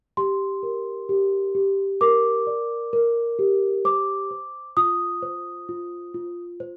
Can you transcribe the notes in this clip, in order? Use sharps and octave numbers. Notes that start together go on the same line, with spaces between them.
G4 C6
A#4
G4
G4
A#4 D6
D5
A#4
G4
C5 D6
C5
F4 D#6
C5
F4
F4
C5